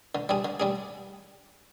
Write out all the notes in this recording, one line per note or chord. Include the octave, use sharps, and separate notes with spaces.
D3
G3 D4 G#4
D3
G3 D4 G#4